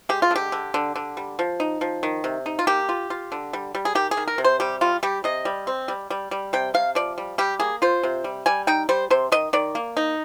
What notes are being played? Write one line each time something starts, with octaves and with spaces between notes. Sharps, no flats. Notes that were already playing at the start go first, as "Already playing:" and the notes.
G#3 G4
F4
D3 G4
D3
D3
D3
G3
F3
D#4
F3
D#3
C3
D#4
F4
A#3 G4
F4
F4
D3
G3
G3
G#4
D#3 G4
G#4
D#3
A#4
C3
C5
G3 G4
G3 F4
G3 G4
C3 D#5
G3
C4
G3
G3
G3
C3 G5
C3 F5
F3 D5
G3
G3 G4
A#3 G#4
F4 C5
C3
G3
G3 G#5
D#4 G5
G3 C5
C3 C5
D#3 D#5
D#3 D5
A#3
D#4